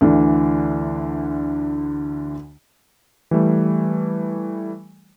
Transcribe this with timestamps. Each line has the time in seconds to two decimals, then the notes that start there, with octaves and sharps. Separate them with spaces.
0.01 D2 D3 E3
3.31 E3 G3 A3